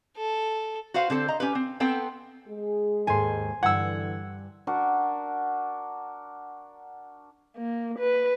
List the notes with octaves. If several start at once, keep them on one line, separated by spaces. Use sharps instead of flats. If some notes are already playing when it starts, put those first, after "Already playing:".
A4
F#4 B4 C5 F5 F#5
D3 C4 A4 C5
D#5 A#5
C#4 G4 B4
C4
B3 C4 A4 G5
G#3 G#4
D#2 G#2 A4 G#5 C6
G2 D3 E3 F#5 E6 G#6
D4 F#4 A#4 F#5
A#3
B4